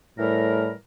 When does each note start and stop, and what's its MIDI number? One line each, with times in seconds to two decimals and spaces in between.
0.19 0.70 45
0.19 0.73 52
0.19 0.73 55
0.19 0.73 70